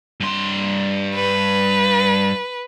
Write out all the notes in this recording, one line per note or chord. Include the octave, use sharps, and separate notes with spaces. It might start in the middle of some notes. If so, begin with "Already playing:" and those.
G2 C6
B4